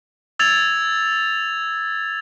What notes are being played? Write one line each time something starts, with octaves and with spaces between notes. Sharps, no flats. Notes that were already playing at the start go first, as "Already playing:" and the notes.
E6 G#6 A6 F7